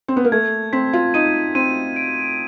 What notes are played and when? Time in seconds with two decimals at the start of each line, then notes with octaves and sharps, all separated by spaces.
0.08 C4
0.16 B3
0.24 A#3
0.32 A3 G#6
0.73 C4 B6
0.93 F4
1.14 D#4 D#7
1.55 C4 D#7
1.96 D7